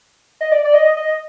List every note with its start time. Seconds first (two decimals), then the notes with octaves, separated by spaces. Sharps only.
0.41 D#5
0.52 D5
0.65 D5
0.74 D#5
0.97 D#5